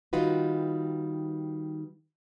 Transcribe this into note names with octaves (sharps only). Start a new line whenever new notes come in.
D#3 G3 D#4 F4 F#4 B4